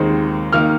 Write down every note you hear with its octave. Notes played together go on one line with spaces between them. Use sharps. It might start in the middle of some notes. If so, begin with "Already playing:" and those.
Already playing: D#2 D#3 G#3 C4
D#3 A#3 F6